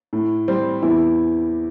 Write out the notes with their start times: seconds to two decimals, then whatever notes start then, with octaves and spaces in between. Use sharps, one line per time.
0.13 A2
0.48 G3 C4
0.82 E2 E4